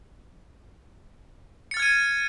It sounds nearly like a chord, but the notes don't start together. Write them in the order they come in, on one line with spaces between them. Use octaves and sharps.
C#7 A6 F6 G#6 D#7